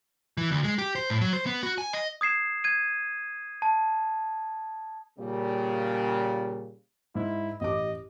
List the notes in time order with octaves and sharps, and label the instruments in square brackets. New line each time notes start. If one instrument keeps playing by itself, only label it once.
[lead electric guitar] E3
D2
G#3
G4
C5
A2
F#3
C5
B3
F#4
G#5
D#5
[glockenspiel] D#6 G#6 C7 E7
G#6 D#7
A5
[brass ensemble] A#2 C#3 G3
[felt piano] G#2 [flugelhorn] E4
[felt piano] A1 G4 D6 [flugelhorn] D#5